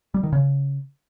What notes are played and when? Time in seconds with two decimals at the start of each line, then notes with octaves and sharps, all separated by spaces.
0.14 G3
0.23 D#3
0.33 C#3